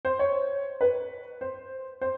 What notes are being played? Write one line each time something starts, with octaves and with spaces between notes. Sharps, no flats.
C5
C#5
B4
C5
C5